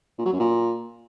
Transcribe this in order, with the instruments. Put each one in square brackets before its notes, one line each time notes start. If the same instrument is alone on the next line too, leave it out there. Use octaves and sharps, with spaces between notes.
[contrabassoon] A#2
F#3
F#2
A#2